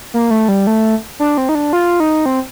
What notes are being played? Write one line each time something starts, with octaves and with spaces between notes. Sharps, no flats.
A#3
A3
G3
A3
D4
C4
D#4
D4
F4
D#4
C4